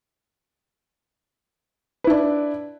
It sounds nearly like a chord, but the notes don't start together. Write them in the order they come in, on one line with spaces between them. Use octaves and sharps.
B4 E4 D4